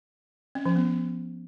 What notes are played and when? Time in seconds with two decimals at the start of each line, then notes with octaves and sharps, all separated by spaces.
0.55 C#4
0.65 F3
0.76 B3